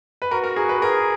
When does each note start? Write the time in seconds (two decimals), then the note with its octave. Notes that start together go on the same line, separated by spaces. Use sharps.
0.22 B4
0.31 F#4 A#4
0.44 A#4
0.56 G#4
0.69 B4
0.82 G#4 A#4